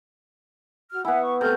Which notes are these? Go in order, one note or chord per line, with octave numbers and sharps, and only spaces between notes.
F#4 F6
B3 E4 E5 F#5 G#5
C#6
C3 A3 A4 F6 G6